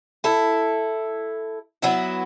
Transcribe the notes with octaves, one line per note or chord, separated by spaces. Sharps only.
E4 A4
F#3 B3 E4